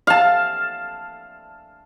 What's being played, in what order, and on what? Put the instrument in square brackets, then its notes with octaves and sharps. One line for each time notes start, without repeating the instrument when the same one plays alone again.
[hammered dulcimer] F5 A5